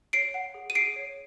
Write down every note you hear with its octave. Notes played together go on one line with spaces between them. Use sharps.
C#5 C7 D7
F#5
G#4
D#7
G#4 C7 D7
C#5